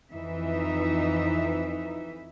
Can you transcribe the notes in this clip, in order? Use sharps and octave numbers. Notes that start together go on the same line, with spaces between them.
F2 E3 D#4 E5